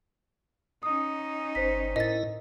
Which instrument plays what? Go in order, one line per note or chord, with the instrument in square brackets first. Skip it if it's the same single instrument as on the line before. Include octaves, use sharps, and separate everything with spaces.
[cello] C#4 D#4 [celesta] D#6
[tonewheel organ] G1 [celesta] C5 B6
[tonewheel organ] A2 E4 A#4 [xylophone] D#5 A6